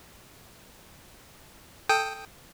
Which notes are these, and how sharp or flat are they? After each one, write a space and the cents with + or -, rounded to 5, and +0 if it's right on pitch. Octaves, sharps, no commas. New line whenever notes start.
A4 +0 G5 +10 D#6 +0